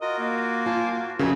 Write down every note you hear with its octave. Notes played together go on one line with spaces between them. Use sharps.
F4 F#4 A#4 D#5
A#3
F4 C5 G#5 A5
F#4
F2 C#3 F#4 A#4 C#5 E5